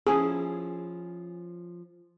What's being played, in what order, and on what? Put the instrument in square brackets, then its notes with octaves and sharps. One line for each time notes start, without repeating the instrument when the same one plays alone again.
[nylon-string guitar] F3 C#4 E4 [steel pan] G#4